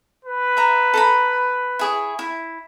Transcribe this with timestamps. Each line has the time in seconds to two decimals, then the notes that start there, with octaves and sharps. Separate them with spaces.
0.25 B4
0.57 E5 A#5
0.94 A4 A#5 B5
1.79 E4 G#4 C#5
2.19 E4